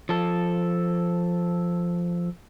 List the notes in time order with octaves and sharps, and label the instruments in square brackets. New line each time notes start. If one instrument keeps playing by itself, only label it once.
[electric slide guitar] F3 A4